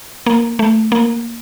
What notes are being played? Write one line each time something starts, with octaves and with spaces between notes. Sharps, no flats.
A#3
A3
A#3